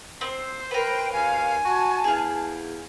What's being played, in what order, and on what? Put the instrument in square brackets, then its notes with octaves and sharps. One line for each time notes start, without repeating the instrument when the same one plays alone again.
[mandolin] C4 [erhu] C5
[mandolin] A#4 B4 [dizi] G5
[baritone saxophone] D#2 [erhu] F5 [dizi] G#5
[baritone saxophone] F#4 [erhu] A5
[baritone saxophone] E2 [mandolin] G#4 F5